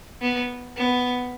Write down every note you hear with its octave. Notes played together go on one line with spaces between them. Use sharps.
B3
B3